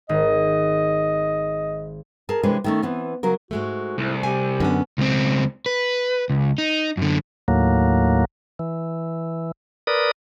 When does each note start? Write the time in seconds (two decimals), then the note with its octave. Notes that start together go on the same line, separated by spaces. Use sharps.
0.09 G#1 D#5
2.29 G#4 A#4 A5
2.43 C3 E3 G#3 D4 B4
2.64 D#3 A3 C#4
2.82 E3 B3 C4
3.23 C#3 F#3 A#4
3.51 G#2 G#3 A3 F#4
3.98 C2 E4
4.23 G4 G#5
4.60 F#2 D3 B3 C#4
4.98 C#2 C4
5.66 B4
6.30 C#2
6.58 D#4
6.97 F#2 D3
7.48 D#2 A2 F#3 A#3
8.59 E3
9.87 A#4 B4 D5 D#6